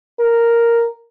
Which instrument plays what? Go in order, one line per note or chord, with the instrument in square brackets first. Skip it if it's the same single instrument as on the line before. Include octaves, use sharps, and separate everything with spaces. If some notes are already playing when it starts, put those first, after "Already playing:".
[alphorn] A#4